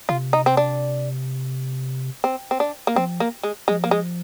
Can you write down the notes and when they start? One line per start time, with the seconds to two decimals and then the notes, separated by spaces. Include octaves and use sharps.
0.09 C3 F4
0.33 D#4
0.46 C4
0.57 D4
2.24 C4
2.51 C4
2.60 D4
2.87 A#3
2.96 F3 C4
3.20 A#3
3.43 G#3
3.68 F3 G#3
3.84 A#3
3.91 G#3